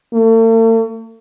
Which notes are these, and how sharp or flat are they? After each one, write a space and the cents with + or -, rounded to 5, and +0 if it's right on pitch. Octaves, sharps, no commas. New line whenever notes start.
A3 +45